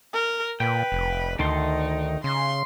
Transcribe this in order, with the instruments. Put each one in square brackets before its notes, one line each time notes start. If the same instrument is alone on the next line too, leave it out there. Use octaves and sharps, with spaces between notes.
[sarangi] A#4
[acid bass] A#2 [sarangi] B4 [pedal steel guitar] G5
[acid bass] F1
[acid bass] D2 [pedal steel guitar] D#3 A4 C6 [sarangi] D#4
[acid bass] C#3 [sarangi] C6